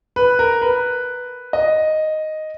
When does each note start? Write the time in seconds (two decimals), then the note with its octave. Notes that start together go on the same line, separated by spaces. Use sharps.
0.16 B4
0.39 A#4
0.62 B4
1.53 D#5